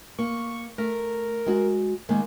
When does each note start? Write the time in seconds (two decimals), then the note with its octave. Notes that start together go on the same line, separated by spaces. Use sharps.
0.19 A#3 C#6
0.78 A3 A#4
1.46 G#3 F#4
2.09 D#3 G#3 A#3